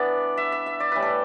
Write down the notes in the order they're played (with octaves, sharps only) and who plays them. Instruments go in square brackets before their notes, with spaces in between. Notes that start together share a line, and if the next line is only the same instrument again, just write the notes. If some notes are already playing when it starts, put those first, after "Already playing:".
Already playing: [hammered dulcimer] E3 B3 D4 D5
E5
E5
E5
D5
A2 E3 G3 B4
A4